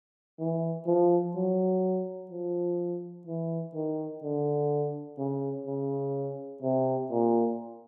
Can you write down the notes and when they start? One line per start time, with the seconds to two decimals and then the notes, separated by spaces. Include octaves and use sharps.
0.39 E3
0.87 F3
1.35 F#3
2.31 F3
3.27 E3
3.75 D#3
4.23 D3
5.18 C#3
5.67 C#3
6.62 C3
7.11 A#2